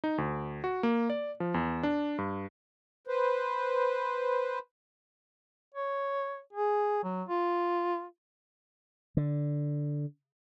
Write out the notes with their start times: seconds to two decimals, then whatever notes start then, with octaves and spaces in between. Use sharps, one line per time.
0.04 D#4
0.18 D2
0.64 F#4
0.83 A#3
1.10 D5
1.40 F3
1.54 E2
1.83 D4
2.18 G2
3.07 B4 C5
5.74 C#5
6.53 G#4
7.03 F#3
7.29 F4
9.17 D3